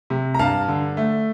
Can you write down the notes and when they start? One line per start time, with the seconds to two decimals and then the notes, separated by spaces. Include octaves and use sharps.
0.10 C3
0.35 A#5
0.39 G2 F5 A5
0.68 D3
0.97 A3